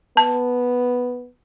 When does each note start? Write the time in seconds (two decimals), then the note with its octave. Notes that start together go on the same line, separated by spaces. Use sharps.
0.17 B3 A5